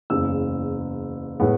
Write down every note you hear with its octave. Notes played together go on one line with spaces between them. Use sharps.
F#1 E2 C#3 E6
A2 G#3 B3